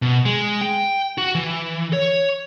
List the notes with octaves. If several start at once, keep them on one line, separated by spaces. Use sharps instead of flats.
B2
G#3
G5
F#4
E3
C#5